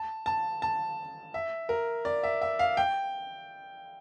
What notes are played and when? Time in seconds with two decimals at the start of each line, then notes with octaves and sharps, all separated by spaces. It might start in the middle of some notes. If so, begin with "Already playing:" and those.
Already playing: A5
0.26 A5
0.62 A5
1.34 E5
1.69 A#4
2.05 D5
2.23 E5
2.41 E5
2.59 F5
2.77 G5